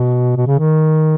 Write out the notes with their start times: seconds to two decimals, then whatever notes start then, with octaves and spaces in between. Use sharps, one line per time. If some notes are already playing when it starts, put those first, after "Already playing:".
Already playing: B2
0.37 B2
0.47 C#3
0.58 D#3